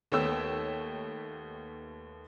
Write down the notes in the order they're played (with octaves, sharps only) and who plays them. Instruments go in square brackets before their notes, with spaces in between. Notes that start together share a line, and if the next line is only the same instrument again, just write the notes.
[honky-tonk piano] D#2 A3 B3 C#5 G5 E6